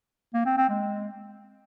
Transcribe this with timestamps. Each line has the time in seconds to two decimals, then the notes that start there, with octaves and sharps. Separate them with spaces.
0.34 A#3
0.46 C4
0.57 C4
0.69 G#3